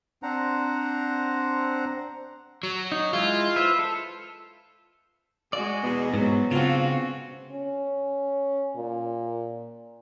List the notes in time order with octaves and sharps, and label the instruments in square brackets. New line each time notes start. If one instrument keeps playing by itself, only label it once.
[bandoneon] C4 D4 C5 F#5 A#5
[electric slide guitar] F#3
[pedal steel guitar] D#4
[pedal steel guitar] G#3 E4 [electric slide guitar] F4
[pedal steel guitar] B4 C5 E5
A4
[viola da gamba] G#3 F#4 G#4 [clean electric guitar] D5
[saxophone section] E2 B2 [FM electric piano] B3
[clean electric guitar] G#2 [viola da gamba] F#3 [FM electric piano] B3
[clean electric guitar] C#3 [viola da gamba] C4 F#4 [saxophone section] D4 F4
[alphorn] C#4
A#2